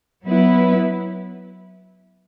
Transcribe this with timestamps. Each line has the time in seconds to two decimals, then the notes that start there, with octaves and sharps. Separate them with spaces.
0.24 F#3 B3 E4 B4